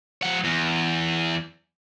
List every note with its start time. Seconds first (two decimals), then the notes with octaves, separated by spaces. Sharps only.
0.23 F3 F#5
0.45 E2